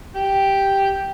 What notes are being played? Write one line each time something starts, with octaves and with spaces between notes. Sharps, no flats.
G4 G5